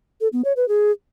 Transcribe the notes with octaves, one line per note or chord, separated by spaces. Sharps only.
A4
B3
C#5
B4
G#4